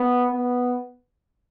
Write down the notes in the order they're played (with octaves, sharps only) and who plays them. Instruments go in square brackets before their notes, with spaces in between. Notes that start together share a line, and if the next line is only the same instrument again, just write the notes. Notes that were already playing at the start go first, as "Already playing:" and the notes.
Already playing: [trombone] B3
B3